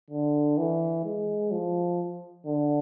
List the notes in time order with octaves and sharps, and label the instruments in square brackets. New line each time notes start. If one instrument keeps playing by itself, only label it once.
[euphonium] D3
E3
G#3
F3
D3